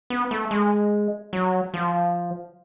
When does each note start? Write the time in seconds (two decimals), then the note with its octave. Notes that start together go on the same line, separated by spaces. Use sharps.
0.10 B3
0.31 A3
0.51 G#3
1.33 F#3
1.74 F3